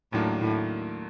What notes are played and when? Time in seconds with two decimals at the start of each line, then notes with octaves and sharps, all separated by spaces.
0.13 D#2 A2 D#3 F#3 A#3 D4
0.41 A2